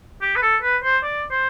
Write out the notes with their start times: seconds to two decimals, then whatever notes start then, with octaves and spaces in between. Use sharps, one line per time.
0.21 G4
0.36 B4
0.42 A4
0.62 B4
0.83 C5
1.03 D5
1.31 C5